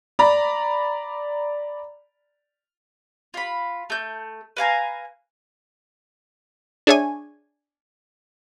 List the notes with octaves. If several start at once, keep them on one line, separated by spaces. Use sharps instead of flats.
D5 A#5 B5
F4 B5
A3 G6
B4 F5 G#5 A#5
D4 G#4 C#5 E5 G#5